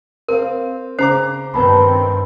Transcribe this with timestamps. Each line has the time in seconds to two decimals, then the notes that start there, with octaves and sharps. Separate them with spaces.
0.28 C4 A#4 F5
0.99 C#3 C5 A#5 D6 C7
1.54 G2 D#3 C4 B4 A5 B5